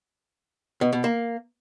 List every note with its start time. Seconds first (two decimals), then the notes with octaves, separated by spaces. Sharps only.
0.81 B2
0.93 B2
1.04 A#3